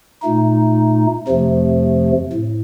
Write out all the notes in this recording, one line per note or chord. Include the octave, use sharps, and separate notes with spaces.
A#2 A3 D#4
F2 C3 F3 A3
A2